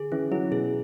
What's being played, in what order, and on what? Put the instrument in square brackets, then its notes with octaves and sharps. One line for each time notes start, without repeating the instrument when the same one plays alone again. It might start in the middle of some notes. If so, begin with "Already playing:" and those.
Already playing: [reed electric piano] D3 [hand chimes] G#4
[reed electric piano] E3 [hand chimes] C#4
[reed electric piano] F#3 [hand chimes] E4
[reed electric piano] B2 [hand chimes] G#4